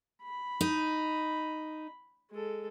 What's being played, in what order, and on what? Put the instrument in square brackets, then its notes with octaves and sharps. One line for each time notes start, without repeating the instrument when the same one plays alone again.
[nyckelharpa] B5
[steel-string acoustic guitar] D#4
[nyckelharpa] G#3 A4